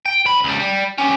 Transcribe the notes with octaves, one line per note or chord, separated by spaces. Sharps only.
G5
D2 B5
C#2 G3
G3
C#4 G4